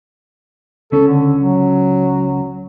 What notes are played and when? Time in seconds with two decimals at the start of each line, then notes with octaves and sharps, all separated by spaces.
0.92 C#2 C#4 A4
1.07 D3
1.40 F#3